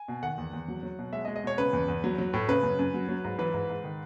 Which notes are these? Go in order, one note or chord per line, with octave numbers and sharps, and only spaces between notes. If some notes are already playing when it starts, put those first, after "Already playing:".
Already playing: G#5
B2
D#3 F#5
E2
E2
F#3
F#3
B2
G#3 E5
D#5
G#3
D#5
B2 C#5
C#3 B4
E2
E2
F#3
F#3
A2
C#3 B4
F#2
F#2
F#3
F#3
G#2
E3 B4
G#2
G#2
D#3